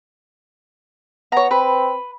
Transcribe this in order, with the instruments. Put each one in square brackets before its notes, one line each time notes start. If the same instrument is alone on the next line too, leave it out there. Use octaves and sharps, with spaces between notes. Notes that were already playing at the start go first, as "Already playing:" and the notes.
[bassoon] B3 [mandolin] C#5 A#5
[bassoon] C4 [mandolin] B4